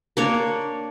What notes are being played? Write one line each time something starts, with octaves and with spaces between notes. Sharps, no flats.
A#3 D4 C#5